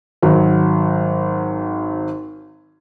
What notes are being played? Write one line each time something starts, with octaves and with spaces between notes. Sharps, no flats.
G#1 F#3